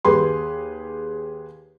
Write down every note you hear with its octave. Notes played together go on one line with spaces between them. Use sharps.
D#2 G4 G#4 B4 C6